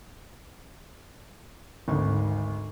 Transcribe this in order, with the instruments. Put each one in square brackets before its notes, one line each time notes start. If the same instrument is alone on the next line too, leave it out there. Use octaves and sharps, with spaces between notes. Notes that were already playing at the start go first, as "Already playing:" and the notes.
[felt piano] G#1 D2 D#4